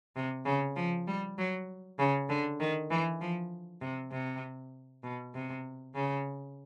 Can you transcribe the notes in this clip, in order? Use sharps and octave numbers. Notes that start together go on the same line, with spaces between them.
C3
C#3
F3
G3
F#3
C#3
D3
D#3
E3
F3
C3
C3
B2
C3
C#3